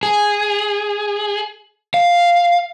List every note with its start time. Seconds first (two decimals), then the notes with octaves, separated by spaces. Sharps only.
0.03 G#4
1.94 F5